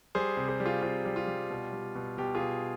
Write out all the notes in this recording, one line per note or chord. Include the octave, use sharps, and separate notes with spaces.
G3 G#4 C5
C3
G#4 C5
G3
F4 G#4
C3 F4
G3
F4
G3
B2
G3
B2
B2 G4
F4 G#4
B2